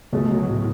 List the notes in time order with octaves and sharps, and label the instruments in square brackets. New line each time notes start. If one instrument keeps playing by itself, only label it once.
[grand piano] C#2 B2 G#3 [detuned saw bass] A3
[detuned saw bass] F#3
A2